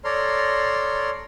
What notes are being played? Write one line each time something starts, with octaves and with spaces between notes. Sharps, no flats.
A4 C#5 D5 A#5 C6 F6